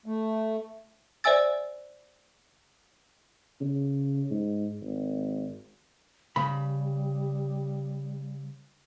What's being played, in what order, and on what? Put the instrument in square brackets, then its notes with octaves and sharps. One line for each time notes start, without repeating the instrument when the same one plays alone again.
[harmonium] A3
[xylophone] C5 D5 E5 G#5 E6 A6
[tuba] C#3
G#2
G#1
[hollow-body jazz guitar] C#3 B5 [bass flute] G3